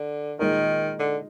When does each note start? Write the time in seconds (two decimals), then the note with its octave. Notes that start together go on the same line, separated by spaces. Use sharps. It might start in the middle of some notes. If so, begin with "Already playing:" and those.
Already playing: D3
0.39 A#2 D#3 G#3 D#4 A#4
0.99 D3